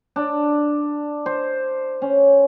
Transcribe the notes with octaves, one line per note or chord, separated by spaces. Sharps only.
D4
C5
C#4